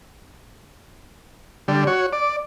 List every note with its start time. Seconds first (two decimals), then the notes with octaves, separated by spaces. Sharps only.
1.68 D3 G3
1.87 F#4 C#5
2.13 D5